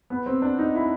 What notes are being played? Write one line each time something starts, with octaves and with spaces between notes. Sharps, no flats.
B3
C4
D4
D#4
E4